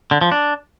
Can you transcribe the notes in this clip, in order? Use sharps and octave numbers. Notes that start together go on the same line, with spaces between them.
D3
F3
D4